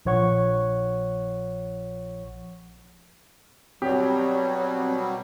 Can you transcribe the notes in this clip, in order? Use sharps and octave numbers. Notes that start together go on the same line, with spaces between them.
A#1 F3 C#5 F#5 C#6
B2 F#3 G3 C4 G4 C#5